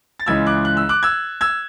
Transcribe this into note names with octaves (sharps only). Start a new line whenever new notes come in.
A6
C#2 C#3 E3 G#3 E6 G#6
D6 F#6
F#6
E6
D6 F#6
E6 G#6
E6 G#6